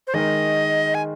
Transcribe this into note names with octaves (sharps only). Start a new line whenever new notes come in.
C5
D#3 G#3 D#4 A#4 D#5
G#5